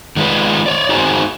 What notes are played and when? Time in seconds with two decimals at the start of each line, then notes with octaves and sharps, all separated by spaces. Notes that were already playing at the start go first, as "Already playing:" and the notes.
0.17 D#3 G#3 A#3 D4 F4 B4
0.66 C#5 D5
0.89 D#4 F#4 G#4 C5 A#5